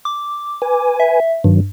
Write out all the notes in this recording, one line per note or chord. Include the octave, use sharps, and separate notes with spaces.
D6
B4 G#5
E5
G2 D#3 F#3